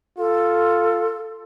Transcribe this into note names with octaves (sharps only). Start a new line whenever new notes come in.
F4 A4